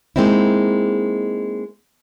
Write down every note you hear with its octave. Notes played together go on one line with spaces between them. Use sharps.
G#3 A#3 C4 D#4 E4